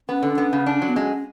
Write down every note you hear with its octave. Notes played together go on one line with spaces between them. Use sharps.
B3 C#4
D3
B3
C#3
D4
F#3
B3
G#3 C#4